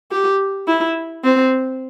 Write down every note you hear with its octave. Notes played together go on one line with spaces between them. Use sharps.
G4
E4
C4